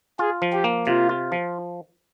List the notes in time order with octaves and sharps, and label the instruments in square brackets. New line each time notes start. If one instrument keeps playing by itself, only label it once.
[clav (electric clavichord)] F4 [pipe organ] G#4
[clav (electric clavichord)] F3
[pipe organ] G4
[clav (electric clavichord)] A#3
[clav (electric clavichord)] C3 [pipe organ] F4
[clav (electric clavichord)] F4
F3